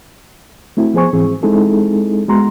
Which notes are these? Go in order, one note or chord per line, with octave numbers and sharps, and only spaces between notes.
A3 C4 E4 F#4
F3 B3 G#4 C5 G#5 C#6
G#2 E3 C4 G#4
G#3 C4 D#4 E4 G#4 A4
G#3 B3 F#4 A#5 C6